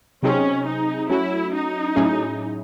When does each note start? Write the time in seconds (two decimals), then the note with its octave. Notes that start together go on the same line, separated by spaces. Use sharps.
0.23 C3 F#3 C4 C#4 D#4 G#4
0.66 D#4
1.09 F#3 A3 C#4 E4 F#4
1.53 D#4
1.96 A2 F#3 C#4 E4 G#4